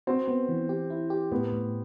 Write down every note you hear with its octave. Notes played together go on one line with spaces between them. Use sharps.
C4 F#4
B3
E3
G4
E4
G4
A2 B3
A2